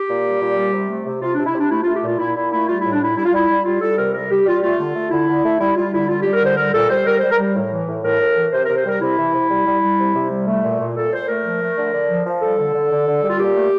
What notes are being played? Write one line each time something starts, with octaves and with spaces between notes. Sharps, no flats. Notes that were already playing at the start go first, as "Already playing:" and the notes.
Already playing: G4
A#2
G3
A#2
G3
C3
A3
C3
C3 F4
C3 D4
E4
C3 D4
A3 E4
A3 F4
G4
A#2 F4
A#2 E4
A#2 E4
A3 E4
G3 F4
A2 E4
D4
G3 E4
G3 E4
F4
G3 E4
G3
G3 F4
G3 A4
C3 A#4
G3 A#4
G3 G4
G3 F4
A3 F4
D3
A3
D3 E4
D3
A3
G3 E4
G3 F4
D3 E4
G3 F4
G3 G4
A#4
D3 C5
G3 A#4
A#2 A4
G3 C5
G3 A#4
G3 C5
A#4
G3
A2
E3
A2
A2 A#4
A2
E3
C3 C5
C3 A#4
C5
G3 A#4
C3 E4
E3
C3
G3
G3
G3
C3
C3
G3
A3
A#2
A#2
A#2 A4
A#2 C5
A3 A#4
F3
A3
D3
D3
F3
F3
G3 A4
D3
D3
D3
D3
G3
F4
A#2 G4
A3